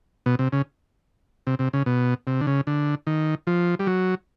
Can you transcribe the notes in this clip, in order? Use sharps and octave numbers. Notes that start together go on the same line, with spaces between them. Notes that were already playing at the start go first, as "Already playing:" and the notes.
B2
C3
C#3
C3
C3
C#3
B2
C3
D3
C#3
D3
D#3
F3
G3
F#3